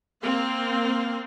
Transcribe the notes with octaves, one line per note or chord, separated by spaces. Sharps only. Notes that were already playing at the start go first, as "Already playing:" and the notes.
A#3 C4 F5